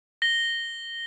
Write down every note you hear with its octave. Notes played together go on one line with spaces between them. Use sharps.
A#6 G7